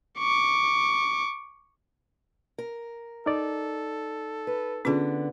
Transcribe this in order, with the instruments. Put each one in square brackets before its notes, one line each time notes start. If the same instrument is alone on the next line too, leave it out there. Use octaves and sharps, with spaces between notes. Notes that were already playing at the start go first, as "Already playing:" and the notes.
[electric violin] C#6 D6
[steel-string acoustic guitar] A#4
[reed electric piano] D#4 D5 [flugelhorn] A4
[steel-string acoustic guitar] B4
[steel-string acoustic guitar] D3 B3 [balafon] C#4 F4 G#4